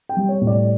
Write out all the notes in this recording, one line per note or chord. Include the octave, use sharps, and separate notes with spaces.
G5
G3
C#5
A2
D5